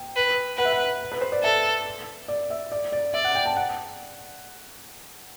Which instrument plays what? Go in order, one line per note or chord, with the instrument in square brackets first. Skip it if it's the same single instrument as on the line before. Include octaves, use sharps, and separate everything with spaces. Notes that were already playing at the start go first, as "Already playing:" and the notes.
Already playing: [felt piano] G5
[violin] B4
[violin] B4 [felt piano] F#5
[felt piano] E5
F#5
B4
C5
D5
[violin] A4 [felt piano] E5
[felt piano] D5
E5
D5
D5
[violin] D5 [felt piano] E5
[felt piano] F#5
G5
A5
F#5